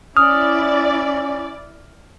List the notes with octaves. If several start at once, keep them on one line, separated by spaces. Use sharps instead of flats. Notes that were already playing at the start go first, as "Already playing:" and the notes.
C#4 E4 D5 D#6 F6